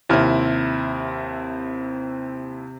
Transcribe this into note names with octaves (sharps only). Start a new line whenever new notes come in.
D#2 C3 C4 E4 F6